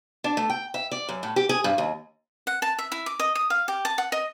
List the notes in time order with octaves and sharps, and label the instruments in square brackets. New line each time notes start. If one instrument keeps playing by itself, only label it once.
[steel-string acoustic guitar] D4
A3
G5
E5
D5
F#2
A2
G4
G#4
G2
D#2
[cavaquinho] F#5
A5
E5
E4
D6
D#5
D#6
F5
G4
A5
F#5
D#5